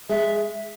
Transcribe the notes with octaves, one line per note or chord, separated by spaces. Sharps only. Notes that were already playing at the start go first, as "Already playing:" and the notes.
G#3 E5